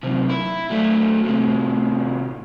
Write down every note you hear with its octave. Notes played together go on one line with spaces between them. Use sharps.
F#2 C3
E4
F#3 A3
A2 C3